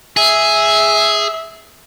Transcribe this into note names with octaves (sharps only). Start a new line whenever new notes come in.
G#4 E5